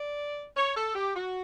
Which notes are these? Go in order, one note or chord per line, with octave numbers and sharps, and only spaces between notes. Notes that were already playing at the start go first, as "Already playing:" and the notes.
Already playing: D5
C#5
A4
G4
F#4